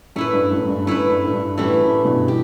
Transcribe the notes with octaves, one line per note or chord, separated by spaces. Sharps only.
F#2 A2 A3 E4 B4
G2
F#2 A2
F#2
G2
F#2 A3 E4 B4
G2
A2
G2
F#2 A2 E3 A3 E4 G4
F#2 A2
G2 B2
G4